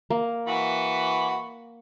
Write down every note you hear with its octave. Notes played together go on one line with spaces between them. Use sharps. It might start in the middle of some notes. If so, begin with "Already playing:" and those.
A#3
E3 F#4 B5